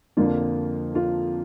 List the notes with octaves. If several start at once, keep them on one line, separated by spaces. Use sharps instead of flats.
F2 D3 F3 A#3 F4
F4